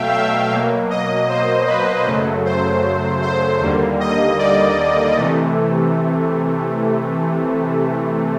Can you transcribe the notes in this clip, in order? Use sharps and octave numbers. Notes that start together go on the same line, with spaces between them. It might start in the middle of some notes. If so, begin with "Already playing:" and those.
Already playing: B2 F#3 A3 E5 F5 G5
E5
B2 F#3 A#3
D#5
C5
B4
F#2 C#3 F#3 A3
C5
C5
D#2 D3 G3 A#3
D#5
D5
C3 E3 A3